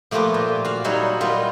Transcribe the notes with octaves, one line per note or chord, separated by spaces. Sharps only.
F3 A3 A#3 F4 G4 B4
A#2
F#4 F5
F#3 G3 D#4 E4 C#5
G3 B3 F4 A#4 B4